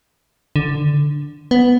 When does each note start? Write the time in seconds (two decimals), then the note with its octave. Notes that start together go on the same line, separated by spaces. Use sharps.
0.56 D3
1.51 B3